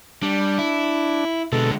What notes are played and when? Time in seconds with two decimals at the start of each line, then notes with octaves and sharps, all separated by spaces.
0.23 G3 D4
0.58 E4
1.52 B2 D3 G#3 A4